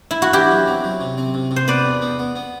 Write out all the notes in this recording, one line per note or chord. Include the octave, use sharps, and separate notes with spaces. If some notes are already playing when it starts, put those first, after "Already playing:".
E4
F#4
E2 E4 G4
F#3
C4
F#3
C3
C4
C3
C3
C5
B3 B4 D5
E2
B3
B3
B3